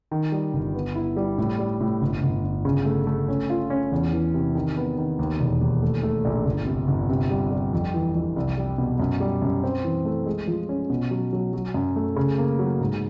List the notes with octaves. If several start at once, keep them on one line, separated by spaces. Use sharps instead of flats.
D#3
G3
G1
B3
E4
G3
A2
G3
A2
G1
G1
G1
C#3
A3
A3
C#4
F4
C#4
E2
E3
C3
D#3
B3
D#3
D#2
E1
D#2
A3
A3
A#1
G1
C3
G1
C3
G3
G3
F2
E3
F2
C2
G3
B2
F#2
G3
F#2
C4
E3
A3
G#3
F3
C#4
B2
F#3
F#3
F#3
F#2
A3
C#3
A#3
F#3
G#2